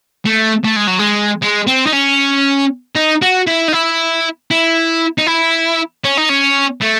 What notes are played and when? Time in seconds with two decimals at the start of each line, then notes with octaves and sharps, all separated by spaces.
0.26 A3
0.65 A3
0.76 G#3
0.87 F#3
0.99 G#3
1.42 G#3
1.67 C4
1.87 D#4
1.93 C#4
2.96 D#4
3.22 F#4
3.47 E4
3.68 D#4
3.72 E4
4.51 E4
5.18 D#4
5.27 E4
6.04 C#4
6.18 D#4
6.29 C#4
6.81 A3